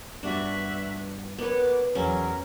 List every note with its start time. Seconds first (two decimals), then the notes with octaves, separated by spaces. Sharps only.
0.23 G2 G3 B3 D4 F#4 E5 C#6 F#6
1.38 B3 A#4 B4 C#5 F#5 D6
1.95 E2 F#3 C#4 A#4